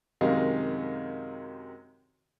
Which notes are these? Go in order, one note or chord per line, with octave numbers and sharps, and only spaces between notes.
F#2 C3 D#3 G#3 D#5 F5